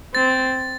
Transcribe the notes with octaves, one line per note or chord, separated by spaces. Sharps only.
C4 A6